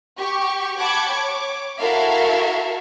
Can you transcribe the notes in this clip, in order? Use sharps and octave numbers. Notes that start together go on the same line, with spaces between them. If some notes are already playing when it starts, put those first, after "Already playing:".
G4 C#6
F#5 G5 A5 B5 D6 G#6
C#5 D6
E4 F#4 A4 A#4 E5 F5